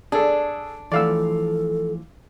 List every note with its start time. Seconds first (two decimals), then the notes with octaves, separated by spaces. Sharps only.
0.12 D4 G#4 A4
0.92 E3 F3 A3 A4 D5 F5 E6